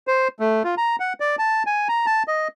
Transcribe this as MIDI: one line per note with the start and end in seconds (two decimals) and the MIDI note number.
0.07 0.28 72
0.40 0.63 57
0.64 0.75 65
0.78 0.96 82
1.00 1.13 78
1.20 1.36 74
1.39 1.63 81
1.66 1.88 80
1.89 2.06 82
2.06 2.23 81
2.28 2.48 75